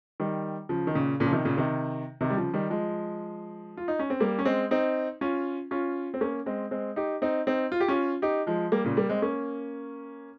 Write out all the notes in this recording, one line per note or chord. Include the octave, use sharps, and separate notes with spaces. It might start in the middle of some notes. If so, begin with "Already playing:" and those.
D#3 G3
C#3 F3
D#3
A#2 C#3
A#2 C#3
F3
C3 D#3
A#2 C#3
C3 D#3
C3 D#3
G3
C#3 F3
D#3 G3
F3 G#3
F4
D#4
C#4
C4
G3 A#3
C#4
G#3 C4
C4 D#4
C#4 F4
C#4 F4
C4
A#3 C#4
G#3 C4
G#3 C4
D#4 G4
C4 D#4
C4 D#4
F4
G4
C#4 F4
D#4 G4
F3 G#3
G3 A#3
A#2 C#3
G3 A#3
G#3 C4
A#3 C#4